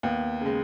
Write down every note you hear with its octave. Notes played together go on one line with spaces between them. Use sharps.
D#2 B3
C#3 G#3